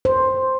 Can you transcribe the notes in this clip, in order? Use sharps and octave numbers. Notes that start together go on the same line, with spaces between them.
C5